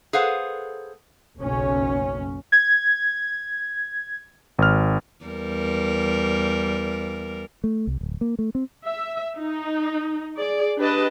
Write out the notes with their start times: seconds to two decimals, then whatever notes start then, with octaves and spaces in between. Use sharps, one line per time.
0.13 G#4 A4 B4 C5 F5 F#5
1.38 F#1 B1 C#4
2.52 G#6
4.58 G#1 F6
5.25 E2 G3 A#4
7.64 A3
7.87 C2
8.01 D1
8.21 A#3
8.39 A3
8.55 C4
8.86 E5
9.36 D#4
10.38 G#4 D5
10.78 D4 G4 B4 D#5 A5